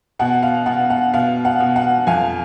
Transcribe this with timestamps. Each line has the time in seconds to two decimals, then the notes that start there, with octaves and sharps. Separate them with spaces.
0.19 B2 F#5
0.43 F5
0.66 B2 F#5
0.90 F#5
1.13 B2 F5
1.45 F#5
1.60 B2
1.76 F#5
2.07 F2 F5 G#5